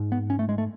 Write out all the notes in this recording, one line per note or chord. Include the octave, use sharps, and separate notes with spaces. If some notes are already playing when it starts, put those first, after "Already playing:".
Already playing: G#2
B3
C#4
A3
G#3
A3